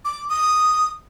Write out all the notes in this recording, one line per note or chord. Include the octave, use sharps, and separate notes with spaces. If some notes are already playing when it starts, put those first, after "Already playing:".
D6
D#6